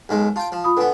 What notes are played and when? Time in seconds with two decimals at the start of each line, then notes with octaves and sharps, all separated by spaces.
0.09 B1 D#3 G#3
0.36 F4 G5 A5
0.52 F3
0.64 F4 B5 D#6
0.77 D3 B3 A4 B4 G#5